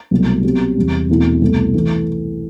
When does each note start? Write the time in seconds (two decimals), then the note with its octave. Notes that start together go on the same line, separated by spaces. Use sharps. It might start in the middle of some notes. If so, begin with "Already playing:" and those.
0.11 C2 B2 F#3 A3
0.43 B2 F#3 C4 G4
0.76 E2 C3 G3
1.09 E2 B2 A3 C4 E4
1.41 C2 B2 A3
1.74 E3 A3